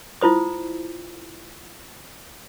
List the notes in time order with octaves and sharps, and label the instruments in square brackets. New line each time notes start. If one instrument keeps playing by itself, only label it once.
[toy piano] E4 F4 C5 D#6